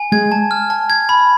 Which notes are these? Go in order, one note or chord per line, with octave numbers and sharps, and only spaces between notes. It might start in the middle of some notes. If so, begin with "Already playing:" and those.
Already playing: G#5
G#3 G#4 G#6
A5
F6
A5
G#6
B5